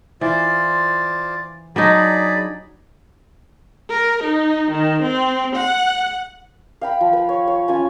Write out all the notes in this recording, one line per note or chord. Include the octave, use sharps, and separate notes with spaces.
E3 F4 C5 D5
F#3 D4 D#4 G#4 D5 B5
A#4
D#4
D#3
C4
F#5
F5 G5 B5
F3
B4
C#5
C#5
C#4 F4 G#5